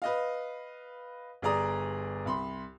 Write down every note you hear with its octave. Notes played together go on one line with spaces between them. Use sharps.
B4 D#5 F5
G1 G#4 D5 A#5 D#6
C2 B5 C6